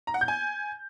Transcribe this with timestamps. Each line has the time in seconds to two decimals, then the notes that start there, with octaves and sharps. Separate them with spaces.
0.07 A#5
0.14 F#5
0.21 G6
0.28 G#5